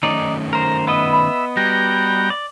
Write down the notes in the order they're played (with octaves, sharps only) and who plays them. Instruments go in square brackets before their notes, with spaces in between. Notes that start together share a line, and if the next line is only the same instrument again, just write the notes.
[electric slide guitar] D#3 A3 C#4 [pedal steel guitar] D#4 D5
[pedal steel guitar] A#4 C5 [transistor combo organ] A#5
[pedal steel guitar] B3 B4 D#5 [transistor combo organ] E5 [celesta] B5
[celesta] B5
[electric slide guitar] G3 [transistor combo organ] F#4 G5 A#5 [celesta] A#6
[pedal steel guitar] D5